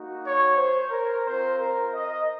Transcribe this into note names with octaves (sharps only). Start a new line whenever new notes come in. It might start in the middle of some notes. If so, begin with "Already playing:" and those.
Already playing: A#3 D#4 F#4
C#5
C5
A#4
C4 F4 C5
A#4
D#5